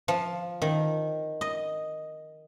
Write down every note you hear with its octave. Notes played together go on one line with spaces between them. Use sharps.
F3
D#3
D#5